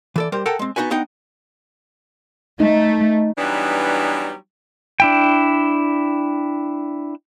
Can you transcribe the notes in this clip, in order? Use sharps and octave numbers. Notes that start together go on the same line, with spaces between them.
E3 A4 D5
G3 G4 A#4 C5
A4 A#4 F#5 G5 A5
G#3 C4
B3 D#4 F#4 B4 G#5
B3 D4 D#4 F#5 G5
A3 D#4
E3 F#3 G3 B3 D4 D#4
D4 E4 G5